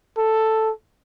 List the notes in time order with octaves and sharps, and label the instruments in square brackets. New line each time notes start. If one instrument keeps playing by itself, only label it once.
[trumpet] A4